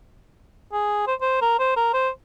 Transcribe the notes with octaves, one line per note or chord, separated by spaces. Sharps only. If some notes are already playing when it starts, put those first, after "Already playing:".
G#4
C5
C5
A#4
C5
A#4
C5